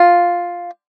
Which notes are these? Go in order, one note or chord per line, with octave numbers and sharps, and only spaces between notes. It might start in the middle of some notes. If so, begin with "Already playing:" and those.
Already playing: F4